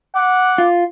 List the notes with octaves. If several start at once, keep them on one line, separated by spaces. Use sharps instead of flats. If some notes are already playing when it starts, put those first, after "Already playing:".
F#5 D6
F4